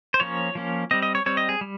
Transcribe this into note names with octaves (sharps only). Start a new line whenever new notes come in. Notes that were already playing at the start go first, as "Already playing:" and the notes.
C5
F3 A#3 C#4 C#5
F3 A#3 C#4
G3 C4 D#5
D#5
C#5
G3 C4 C#5
D#5
G#4
G3